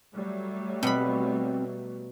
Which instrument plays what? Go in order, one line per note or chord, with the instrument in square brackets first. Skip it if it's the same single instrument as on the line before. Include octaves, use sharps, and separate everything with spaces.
[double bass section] F#3 G3 A3
[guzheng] B2 B5 [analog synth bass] C4